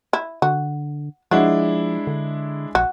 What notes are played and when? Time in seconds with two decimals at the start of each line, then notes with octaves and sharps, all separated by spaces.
0.13 E4
0.42 D3 F#4
1.31 F3 G#3 D4 E4 F#4
2.07 D3
2.75 A#1 F#4